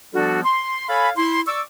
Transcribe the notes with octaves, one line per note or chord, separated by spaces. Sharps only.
F3 G3 B3 D4 F#4 A4
C6
A4 C#5 F5 G#5 B5
E4 C6
D5 C#6 D6 E6